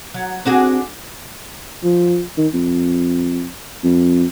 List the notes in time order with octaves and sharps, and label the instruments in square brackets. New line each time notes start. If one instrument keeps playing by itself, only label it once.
[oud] F#3
[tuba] C4 [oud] D4 F#4 G#4
[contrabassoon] F3
D#3
F2
F2